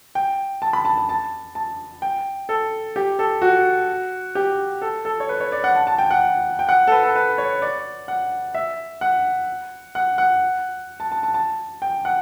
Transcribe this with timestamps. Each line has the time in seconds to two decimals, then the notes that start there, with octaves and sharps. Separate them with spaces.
0.15 G5
0.62 A5
0.73 B5
0.85 A5
0.98 A5
1.09 A5
1.55 A5
2.02 G5
2.49 A4
2.96 G4
3.19 A4
3.42 F#4
4.35 G4
4.82 A4
5.05 A4
5.20 C#5
5.29 B4
5.40 C#5
5.52 D5
5.64 F#5
5.76 A5
5.87 A5
5.98 G5
6.11 F#5
6.59 G5
6.69 F#5
6.87 A4
6.92 B4
7.03 A4
7.16 B4
7.38 C#5
7.62 D5
8.08 F#5
8.55 E5
9.01 F#5
9.95 F#5
10.18 F#5
11.00 A5
11.12 A5
11.23 A5
11.34 A5
11.82 G5
12.05 F#5